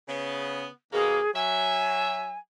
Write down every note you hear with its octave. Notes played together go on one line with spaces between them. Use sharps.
C#3 B3
D#2 B2 A#3 G#4
F#3 E5 G#5